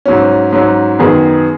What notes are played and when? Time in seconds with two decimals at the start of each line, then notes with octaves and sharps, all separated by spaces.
0.05 G#2 F#3 C#4
0.53 G#2 F#3 C#4
0.99 F#2 D#3 B3 G#4